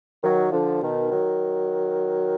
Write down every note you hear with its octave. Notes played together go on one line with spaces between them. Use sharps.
D#3 F#3
D3 F3
B2 D#3
D#3 F#3